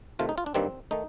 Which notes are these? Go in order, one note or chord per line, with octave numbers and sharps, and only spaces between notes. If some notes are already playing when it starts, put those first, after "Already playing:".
C3 D#3 A3 F4
D#4
F4
D4
G2 D#3 G3 A#3 C4
D#3 A3 D#4